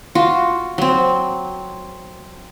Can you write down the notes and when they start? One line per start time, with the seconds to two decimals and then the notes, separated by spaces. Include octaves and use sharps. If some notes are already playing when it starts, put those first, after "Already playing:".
0.15 F4 F#4
0.78 F#3 C4